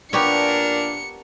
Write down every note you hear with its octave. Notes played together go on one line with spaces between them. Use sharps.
A#2 B3 D4 G4 A#4 C#5 C#7